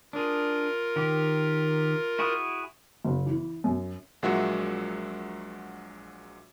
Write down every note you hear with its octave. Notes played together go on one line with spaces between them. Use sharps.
D4 F4 G#4 A#4
D#3 G4
E4 F#4 G#4
F#1
E3
F#2
A#1 A#2 F#3 G#3 F#4 E5